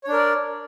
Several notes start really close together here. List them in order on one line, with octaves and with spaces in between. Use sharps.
C#5 D4 A#4 D5